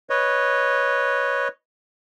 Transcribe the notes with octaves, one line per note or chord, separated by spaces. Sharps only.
B4 C#5 D#5